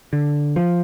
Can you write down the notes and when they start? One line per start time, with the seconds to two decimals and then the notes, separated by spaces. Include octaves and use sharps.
0.13 D3
0.56 F3